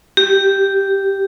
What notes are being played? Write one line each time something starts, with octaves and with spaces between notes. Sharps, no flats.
G4